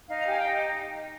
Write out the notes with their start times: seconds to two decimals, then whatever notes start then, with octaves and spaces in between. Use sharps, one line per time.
0.08 D#4 F5
0.20 A#5
0.26 G4 G#5
0.39 D#4 G5